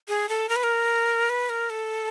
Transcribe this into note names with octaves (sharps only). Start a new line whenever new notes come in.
G#4
A4
A#4
B4
A#4
B4
A#4
A4